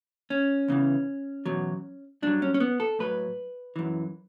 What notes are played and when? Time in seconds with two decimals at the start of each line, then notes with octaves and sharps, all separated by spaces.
0.30 C#4
0.68 E2 C#3 E3
1.46 E2 B2 F#3
2.22 G2 F#3 D4
2.42 C#4
2.54 C#4
2.60 B3
2.80 A4
2.99 A2 F#3 B4
3.76 F#2 E3